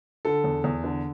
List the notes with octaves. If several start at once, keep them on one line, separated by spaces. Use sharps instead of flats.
D3 A4
E2
E2
D3